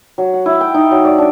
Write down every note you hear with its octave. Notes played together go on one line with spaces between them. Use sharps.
F#3
F#5
E4
G5
D#4
F#3
D5
D4